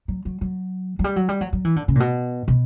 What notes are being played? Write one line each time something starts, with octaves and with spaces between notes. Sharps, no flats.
F#3
F#3
F#3
F#3
G3
F#3
G3
F#3
F#3
E3
D3
C#3
A#2
B2
B2